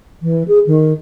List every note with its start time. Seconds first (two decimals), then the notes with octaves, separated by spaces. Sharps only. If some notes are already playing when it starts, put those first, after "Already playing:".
0.22 E3
0.48 G#4
0.66 D#3